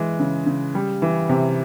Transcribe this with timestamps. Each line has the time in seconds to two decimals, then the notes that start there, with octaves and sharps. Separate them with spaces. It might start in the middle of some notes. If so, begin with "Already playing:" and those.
Already playing: E3 G#3
0.19 C#3
0.46 C#3
0.75 G3
1.02 E3
1.29 C3